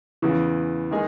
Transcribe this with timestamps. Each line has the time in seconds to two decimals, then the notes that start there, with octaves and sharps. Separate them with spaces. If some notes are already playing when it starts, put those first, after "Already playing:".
0.22 E2 C#3 E3
0.91 D#3 G#3 D#4 G#4